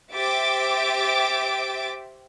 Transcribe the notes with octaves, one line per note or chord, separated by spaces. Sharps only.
G4 C5 E5 D6 A6 D7